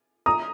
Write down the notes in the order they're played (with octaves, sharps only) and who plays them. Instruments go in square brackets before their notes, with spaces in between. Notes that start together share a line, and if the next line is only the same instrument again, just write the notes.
[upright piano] A#5 D#6